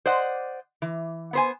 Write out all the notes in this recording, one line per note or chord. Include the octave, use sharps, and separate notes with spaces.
C5 D5 D#5 F#5
E3
B3 C5 G#5